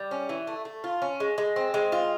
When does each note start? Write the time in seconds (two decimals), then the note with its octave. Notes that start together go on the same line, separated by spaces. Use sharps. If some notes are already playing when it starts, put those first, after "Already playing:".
Already playing: G3
0.11 C#4
0.29 E3
0.47 A3
0.65 A3
0.84 F4
1.02 C#4
1.20 G#3
1.38 G#3
1.56 C4
1.74 G#3
1.92 F4